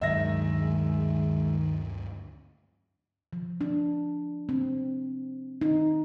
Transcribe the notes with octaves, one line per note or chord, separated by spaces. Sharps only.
D2 G2 D#3 F#3 G#3 E5 A#6
F3
D4
C4
D#4